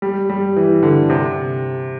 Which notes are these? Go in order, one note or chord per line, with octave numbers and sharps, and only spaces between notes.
G3
G3
E3
D3
C3